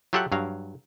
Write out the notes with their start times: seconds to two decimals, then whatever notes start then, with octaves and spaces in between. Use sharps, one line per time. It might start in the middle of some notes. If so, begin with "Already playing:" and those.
0.13 F#3 F4 G4 A4 E5 F#5
0.32 G2 F#3 F5